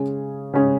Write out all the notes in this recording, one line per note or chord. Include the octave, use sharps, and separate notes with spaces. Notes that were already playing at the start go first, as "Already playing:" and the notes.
Already playing: C#3 G#3 C#4 G#4
C#3 G#3 C#4 G#4